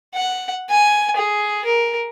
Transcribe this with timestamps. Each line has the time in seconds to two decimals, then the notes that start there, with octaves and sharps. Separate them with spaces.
0.14 F#5
0.70 G#5
1.17 G#4
1.65 A#4